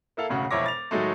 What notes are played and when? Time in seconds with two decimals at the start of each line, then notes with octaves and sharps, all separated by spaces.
0.17 A#3 E4 A4 F5
0.29 E1 A2 C#3 F#4
0.51 E1 F2 E4 C#5 D6 A#6
0.66 A6 F7
0.91 A2 D#3 F#3 G#3 A3